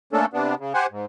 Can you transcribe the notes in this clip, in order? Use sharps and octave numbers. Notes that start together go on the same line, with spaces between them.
A3 A#3 C#4 D4 A4
C3 B3 D4
C#3
G4 C5 F#5 G#5
G#2